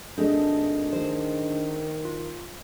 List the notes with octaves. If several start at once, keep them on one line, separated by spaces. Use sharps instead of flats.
G#1 A3 D4 G#4 D#5
D#3 C5
F4